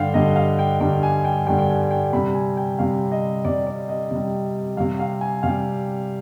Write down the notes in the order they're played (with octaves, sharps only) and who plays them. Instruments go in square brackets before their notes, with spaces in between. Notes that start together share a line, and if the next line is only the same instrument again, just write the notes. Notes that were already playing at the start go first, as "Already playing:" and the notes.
Already playing: [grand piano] G2 D3 G3 F5 G5
G2 D3 G3 D#5
F5
G5
G2 D3 G3 G5
G#5
G5
G2 D3 G3 G5
G5
G#5
G5
C3 G3 B5
G#5
G5
C3 G3 F5
D#5
C3 G3 D5
D5
D#5
C3 G3
C3 G3 F5
F5
G#5
C3 G3 F5